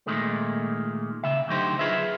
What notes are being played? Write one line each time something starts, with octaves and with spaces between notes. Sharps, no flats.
A#2 D#3 G#3 A3
C#3 E5
D2 D3 F#3 D#4 G4 C5
F4 G#4 B4 E5